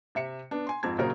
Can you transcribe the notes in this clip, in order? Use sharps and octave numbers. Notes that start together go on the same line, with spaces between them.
C3 E5 C#7
B3 D4
G#5 C6
F2 G#2 F3 C4 A5 G#6
A#1 C#3 F#3 A#4 C5 A#5